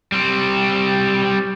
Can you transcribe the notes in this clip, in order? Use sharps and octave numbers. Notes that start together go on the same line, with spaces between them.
G3 C4